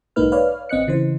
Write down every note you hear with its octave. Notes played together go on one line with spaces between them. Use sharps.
B1 G#2 A#3 D#4 B4 F6
B4 C#5 D5 F5 F6
G#1 C4 D#5 F#6 C#7
C#3 E3 C5